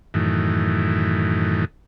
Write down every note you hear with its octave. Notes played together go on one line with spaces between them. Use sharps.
F#2 A2 D#3 E3